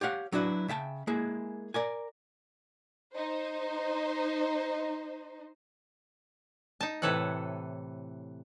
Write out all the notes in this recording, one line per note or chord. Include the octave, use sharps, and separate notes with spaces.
G4 C#5 F5 F#5
F#3 D4 E4 F#4 B4
C#3 E5 G5 A5
G#3 A#3 E4 G#4
A#4 D5 G#5
D#4 C5
D#4 A5
A2 C3 E3 A4 C#5 F#5